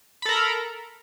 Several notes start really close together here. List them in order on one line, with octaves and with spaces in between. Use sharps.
B5 A4 A#4 A#5